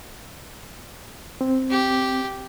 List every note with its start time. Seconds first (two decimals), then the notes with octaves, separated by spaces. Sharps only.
1.41 C4
1.70 G4